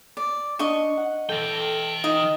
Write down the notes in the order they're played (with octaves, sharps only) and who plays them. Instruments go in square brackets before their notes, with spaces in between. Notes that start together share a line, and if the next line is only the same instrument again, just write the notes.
[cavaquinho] D5
[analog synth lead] D4 [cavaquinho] D#5 C#6
[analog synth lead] F#5
[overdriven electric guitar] E3 G5 [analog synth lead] A4
[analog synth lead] D#4 [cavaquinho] D#5